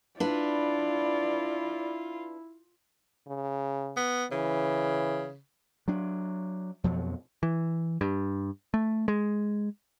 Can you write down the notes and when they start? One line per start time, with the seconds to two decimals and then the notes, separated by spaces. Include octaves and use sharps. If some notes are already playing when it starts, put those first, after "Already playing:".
0.20 D4 E4 F4 B4 D5
3.27 C#3
3.97 B3
4.32 C#3 E3
5.88 F#3 D4
6.84 F2 B2 F3 F#3
7.43 E3
8.01 G2
8.74 A3
9.08 G#3